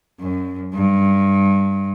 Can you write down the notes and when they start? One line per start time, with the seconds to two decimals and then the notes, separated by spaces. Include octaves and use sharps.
0.20 F#2
0.74 G2